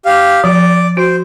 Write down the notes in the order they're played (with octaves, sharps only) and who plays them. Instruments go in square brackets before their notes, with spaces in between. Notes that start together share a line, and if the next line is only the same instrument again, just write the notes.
[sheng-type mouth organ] G4 F5
[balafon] F3 [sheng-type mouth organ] D5
[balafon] F#4 [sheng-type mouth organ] C5